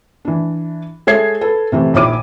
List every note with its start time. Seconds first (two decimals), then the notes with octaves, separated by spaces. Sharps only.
0.25 E3 D4
1.07 G#3 A4 C#5 E5 G#6 C7
1.41 A4 B4
1.72 C3 E3 A3
1.94 A#1 D#3 E4 C#5 D6 D#7